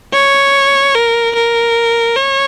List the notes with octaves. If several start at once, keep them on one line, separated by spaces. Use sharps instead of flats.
C#5
A#4
A#4
C#5